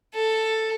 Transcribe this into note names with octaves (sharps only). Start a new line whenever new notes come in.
A4